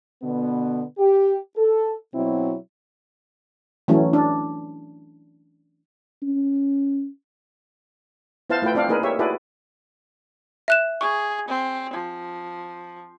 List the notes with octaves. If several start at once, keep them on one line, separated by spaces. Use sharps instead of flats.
B2 D3 B3
G4
A4
B2 F#3 C4 E4
E3 F#3 A3 C#4
D4
C#4
B3 E4 C5 F5 A5
A3 E4 F4 B4 G5
C4 D4 A4 D5 F5
A#3 D#4 G#4 A#4 B4
G4 C#5 E5
E4 F#4 G#4 A4 B4 D5
E5 F#6 E7
G#4 C#6
C4
F3